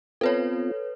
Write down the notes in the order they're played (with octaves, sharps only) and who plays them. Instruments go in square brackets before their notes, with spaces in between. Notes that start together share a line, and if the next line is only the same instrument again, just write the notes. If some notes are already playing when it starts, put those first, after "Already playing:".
[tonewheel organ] B3 C4 F4 [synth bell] A4 B4 C#5